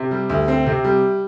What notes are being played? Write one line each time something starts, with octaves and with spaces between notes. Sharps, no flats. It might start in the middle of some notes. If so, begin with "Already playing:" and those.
Already playing: C3
G3
D2
C4
C3
G3